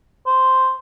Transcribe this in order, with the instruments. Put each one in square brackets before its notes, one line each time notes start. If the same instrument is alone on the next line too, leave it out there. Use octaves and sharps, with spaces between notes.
[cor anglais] C5